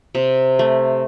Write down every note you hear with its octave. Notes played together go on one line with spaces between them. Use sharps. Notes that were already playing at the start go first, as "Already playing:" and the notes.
C3
A3